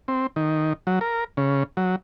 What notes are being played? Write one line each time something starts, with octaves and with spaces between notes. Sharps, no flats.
C4
D#3
F#3
A#4
C#3
F#3